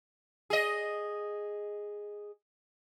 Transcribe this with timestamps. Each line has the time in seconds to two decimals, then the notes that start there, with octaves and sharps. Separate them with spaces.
0.50 G#4 D#5